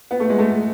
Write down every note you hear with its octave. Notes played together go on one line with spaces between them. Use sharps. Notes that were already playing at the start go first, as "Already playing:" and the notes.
B3
A3
G#3
A3